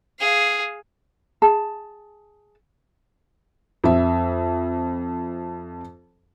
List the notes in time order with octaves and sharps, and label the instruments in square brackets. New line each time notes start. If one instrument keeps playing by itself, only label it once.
[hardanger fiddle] G#4 F5
[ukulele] G#4 A5
[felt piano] F2 E5